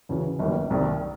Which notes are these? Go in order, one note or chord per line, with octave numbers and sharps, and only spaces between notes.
D2 C#3 E3
G1 F#2 D#3 G3 A#3
C2 C3 D#3 G3 A#3